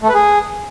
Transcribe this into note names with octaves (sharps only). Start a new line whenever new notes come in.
A3
B4
G#4